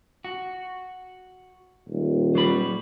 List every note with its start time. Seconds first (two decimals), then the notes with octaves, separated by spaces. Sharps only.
0.25 F#4
1.88 D#1
2.35 F#3 G3 B5